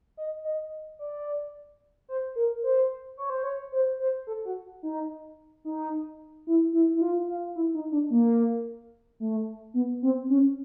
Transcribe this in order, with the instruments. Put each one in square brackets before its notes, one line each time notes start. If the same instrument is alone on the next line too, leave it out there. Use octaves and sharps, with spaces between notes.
[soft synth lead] D#5
D#5
D5
C5
A#4
C5
C#5
C5
C#5
C5
C5
A4
F#4
D#4
D#4
E4
E4
E4
F4
F4
E4
D#4
D4
A#3
A3
B3
C4
C#4